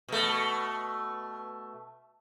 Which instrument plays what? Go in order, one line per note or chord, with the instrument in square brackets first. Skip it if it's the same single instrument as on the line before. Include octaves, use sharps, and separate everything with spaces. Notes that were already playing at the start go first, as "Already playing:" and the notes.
[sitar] B2 A3